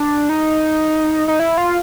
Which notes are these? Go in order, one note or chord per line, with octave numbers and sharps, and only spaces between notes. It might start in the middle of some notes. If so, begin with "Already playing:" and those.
Already playing: D4
D#4
D#4
E4
F4